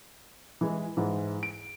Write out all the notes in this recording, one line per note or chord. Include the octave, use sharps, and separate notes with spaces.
E3 G#3
G#2 E3
D7